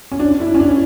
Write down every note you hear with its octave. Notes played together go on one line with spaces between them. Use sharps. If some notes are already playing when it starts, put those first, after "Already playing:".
C#4
D4
E4
C#4
D4